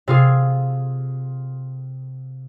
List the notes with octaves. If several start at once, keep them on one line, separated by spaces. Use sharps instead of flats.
C3 F4 G#4